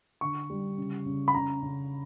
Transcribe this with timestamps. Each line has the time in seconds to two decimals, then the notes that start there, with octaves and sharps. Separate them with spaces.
0.21 D3 C#6
0.50 G3
0.78 C#3
1.06 C#3
1.28 B5
1.34 C#3 A#5
1.62 C#3